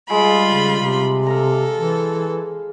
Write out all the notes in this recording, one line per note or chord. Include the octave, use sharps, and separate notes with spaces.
G3 G#3 F4 B5
C#3
C3
A4 F5 A#5
E3